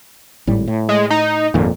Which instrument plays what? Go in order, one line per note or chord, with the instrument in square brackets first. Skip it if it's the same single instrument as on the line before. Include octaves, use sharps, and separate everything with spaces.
[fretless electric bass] G#1 A2 G3
A2
[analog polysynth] G#3
D#4
[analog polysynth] G#1 [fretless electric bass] F2 A#2